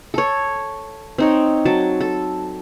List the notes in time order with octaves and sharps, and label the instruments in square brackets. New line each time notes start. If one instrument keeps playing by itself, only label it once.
[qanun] A4 C#5
C4 D#4 C#5
F#3 A5
A4